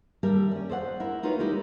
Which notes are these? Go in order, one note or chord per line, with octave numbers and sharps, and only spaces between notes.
D#2 G3 G4 A4 A#4 E5
C#4 D5
A4 C5 D5 F#5
E4 A#4
D#4 F4 F#4 A#4 B4 C#5
G#3 B3 D#4 E4 G4 A#4